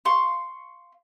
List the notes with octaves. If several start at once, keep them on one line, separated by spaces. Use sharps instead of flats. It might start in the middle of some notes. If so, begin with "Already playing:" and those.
F5 C6 C#6